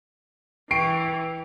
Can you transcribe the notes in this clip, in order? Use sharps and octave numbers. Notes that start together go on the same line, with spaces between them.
E3 G5 C#6 C7 D7